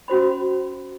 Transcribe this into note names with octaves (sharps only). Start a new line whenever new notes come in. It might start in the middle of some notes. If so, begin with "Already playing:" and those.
C#4 F#4 C5 B5